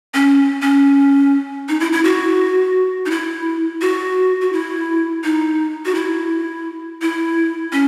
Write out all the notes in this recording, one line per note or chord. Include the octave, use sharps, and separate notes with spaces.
C#4
C#4
D#4
E4
E4
F#4
D#4
E4
F#4
F#4
E4
D#4
F#4
E4
E4
C#4